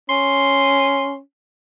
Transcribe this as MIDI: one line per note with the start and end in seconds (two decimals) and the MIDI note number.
0.09 1.19 61
0.09 1.14 84